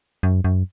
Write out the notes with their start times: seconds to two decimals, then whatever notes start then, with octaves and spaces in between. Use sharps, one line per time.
0.23 F#2
0.45 F#2